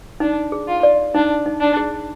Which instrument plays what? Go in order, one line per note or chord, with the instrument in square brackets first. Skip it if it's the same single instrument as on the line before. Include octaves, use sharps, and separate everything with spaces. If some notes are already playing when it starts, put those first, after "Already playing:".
[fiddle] D4 [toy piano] D#4
[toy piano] G#4
[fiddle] F4
[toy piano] D5
[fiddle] D4 [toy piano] D#4
[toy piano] D#4
[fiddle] D4
[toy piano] G#4